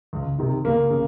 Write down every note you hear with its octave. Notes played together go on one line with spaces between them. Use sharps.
C#2
C3 D#3
C#2 A#3
C#3